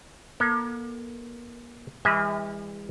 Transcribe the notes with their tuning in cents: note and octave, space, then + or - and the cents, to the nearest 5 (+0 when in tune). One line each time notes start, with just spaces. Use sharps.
A#3 +40 A4 +45
E3 +0 G#3 -45 E5 -40